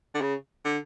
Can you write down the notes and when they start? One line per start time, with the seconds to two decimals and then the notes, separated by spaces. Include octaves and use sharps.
0.14 D3
0.21 C#3
0.65 D3